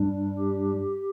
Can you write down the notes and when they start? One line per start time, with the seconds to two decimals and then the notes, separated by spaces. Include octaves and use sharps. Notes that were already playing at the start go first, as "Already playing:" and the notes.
Already playing: G2 G3 D4
0.38 G4